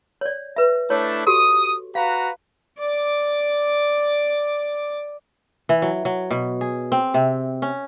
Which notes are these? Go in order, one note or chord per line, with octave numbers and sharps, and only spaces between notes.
C#5 D5
B4 E5
A3 D4 E4 C#5
F#4 G4 A4 D#6
F#4 B4 F5 A#5
D5 D6
E3
F#3
F#3
B2
G#4
C4
C3
C#4